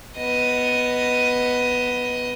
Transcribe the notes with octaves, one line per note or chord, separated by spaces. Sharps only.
B3 D#5